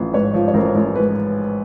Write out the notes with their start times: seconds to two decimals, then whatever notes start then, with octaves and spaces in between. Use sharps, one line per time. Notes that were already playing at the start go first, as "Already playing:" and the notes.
Already playing: A1 F3 C5
0.13 G#2 B4 C#5
0.34 F3
0.48 C#5
0.54 A1 A#4 C5
0.75 A1
0.96 G#2 B4